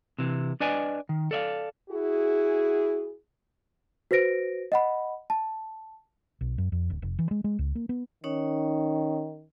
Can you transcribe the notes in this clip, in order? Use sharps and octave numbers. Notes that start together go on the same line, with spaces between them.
C3 E3
D4 B4 D5 D#5 G#5
D#3
A4 D5 E5 F5
E4 F#4 G#4
F#4 B4 C5 A#6 D7
D#5 F#5 B5
A5
B1
F#2
F2
D1
F1
E3
G#3
G#3
C#2
A#3
B3
D#3 C#4 D#4 C#5